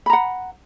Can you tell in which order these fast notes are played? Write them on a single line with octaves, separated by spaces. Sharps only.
B5 A#5 F#5